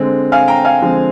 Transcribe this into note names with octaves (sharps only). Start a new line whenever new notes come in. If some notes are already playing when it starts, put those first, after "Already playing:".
Already playing: D3 G#3 C4
F5 G#5
G5 A#5
F5 G#5
D3 F3 G#3 C4